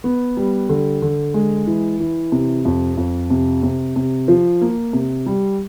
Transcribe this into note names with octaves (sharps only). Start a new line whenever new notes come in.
B3
G3
D3
D3
G#3
E3
E3
C3
F2
F2
C3
C3
C3
F3
A#3
C3
G3